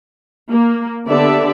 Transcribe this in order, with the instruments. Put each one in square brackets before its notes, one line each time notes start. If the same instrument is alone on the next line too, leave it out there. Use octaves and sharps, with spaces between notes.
[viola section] A#3
D3 B3 G4 D5 E5 A5